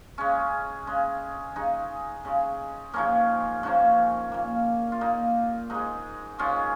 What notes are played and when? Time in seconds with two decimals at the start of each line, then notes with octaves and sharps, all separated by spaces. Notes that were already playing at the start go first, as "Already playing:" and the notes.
0.18 C#3 G#3 C#4
0.87 C#3 G#3
1.56 C#3 G#3 D#4
2.25 C#3 G#3
2.93 G#2 F3 A#3 C#4
3.63 G#2 F3 A#3 C#4
4.32 A#2 A#3
4.92 F4
5.01 A#2 A#3 D#4
5.70 G#2 G#3 D#4
6.39 G#2 G#3 C#4 F4